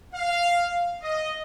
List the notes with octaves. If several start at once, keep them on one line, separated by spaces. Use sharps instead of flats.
F5
D#5